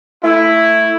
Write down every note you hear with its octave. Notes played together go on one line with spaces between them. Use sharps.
A3 E4